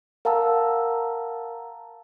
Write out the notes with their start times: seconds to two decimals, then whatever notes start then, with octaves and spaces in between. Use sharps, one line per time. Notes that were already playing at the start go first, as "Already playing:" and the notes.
0.25 A#4 F5 F#5 A5 A#5 E6